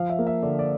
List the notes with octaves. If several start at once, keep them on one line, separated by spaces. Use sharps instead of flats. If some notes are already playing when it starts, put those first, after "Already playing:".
Already playing: F3 F5
E5
A#3
E5
D3 D5
D5